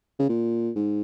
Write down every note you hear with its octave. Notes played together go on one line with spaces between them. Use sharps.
C#3
A#2
G#2